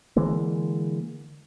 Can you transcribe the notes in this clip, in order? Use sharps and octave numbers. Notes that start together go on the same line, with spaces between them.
D3 E3 G#3 A#3